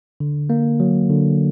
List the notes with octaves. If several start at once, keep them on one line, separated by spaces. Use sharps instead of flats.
D3
A#3
F#3
D3